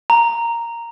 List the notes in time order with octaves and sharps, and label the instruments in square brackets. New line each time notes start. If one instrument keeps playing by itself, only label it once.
[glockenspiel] A#5